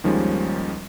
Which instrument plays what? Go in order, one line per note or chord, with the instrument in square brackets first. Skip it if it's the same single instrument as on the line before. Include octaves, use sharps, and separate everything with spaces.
[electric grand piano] D#2 D#3 F3 G3 G#3 C#4